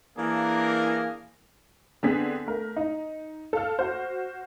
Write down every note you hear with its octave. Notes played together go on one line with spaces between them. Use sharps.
E3 A#3 D4 G#4 A#4
D3 B3 C4 G#4 B6
A3 A#4
D#4
A4 F5 F6
F#4 C5